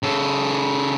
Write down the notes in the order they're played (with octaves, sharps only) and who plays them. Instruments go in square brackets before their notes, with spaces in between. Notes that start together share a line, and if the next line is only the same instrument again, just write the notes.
[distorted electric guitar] C#3 A4